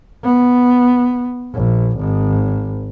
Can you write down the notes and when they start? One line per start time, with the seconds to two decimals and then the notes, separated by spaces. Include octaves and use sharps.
0.24 B3
1.53 A#1
1.98 G#1